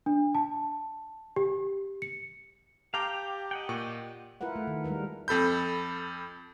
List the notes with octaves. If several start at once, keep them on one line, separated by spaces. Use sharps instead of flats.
D4
A5
G4
C#7
G4 F5 G5 A5 A#5 D6
D#5 F#5 G5
A#2 C#6
E4 F4 A#4 B4 F#5
A3
D#3
G3 G#3 A#4 B4
F2 A4 B5 G6